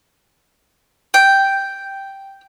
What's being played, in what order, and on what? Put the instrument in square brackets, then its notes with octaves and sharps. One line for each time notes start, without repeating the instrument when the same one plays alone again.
[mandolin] G5